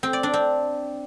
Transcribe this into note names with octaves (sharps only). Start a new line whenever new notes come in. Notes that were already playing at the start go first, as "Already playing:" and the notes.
C4
D5
D4
C4